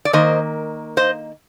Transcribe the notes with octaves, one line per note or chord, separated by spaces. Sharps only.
D5
D#3 A#3 C5 D#5
C5 D#5